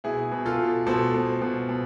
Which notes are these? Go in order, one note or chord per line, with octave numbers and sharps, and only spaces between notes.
B2 E4 G#4
B2
F4 A4
B2
B2 A4 C5
B2
B2
B2